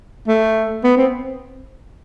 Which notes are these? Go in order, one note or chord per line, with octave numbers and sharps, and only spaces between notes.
A3
B3
C4